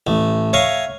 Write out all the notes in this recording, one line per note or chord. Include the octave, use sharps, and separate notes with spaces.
A1 A3
C#5 E5 F5 G#5 A#5